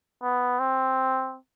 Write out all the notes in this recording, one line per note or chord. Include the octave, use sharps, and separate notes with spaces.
B3
C4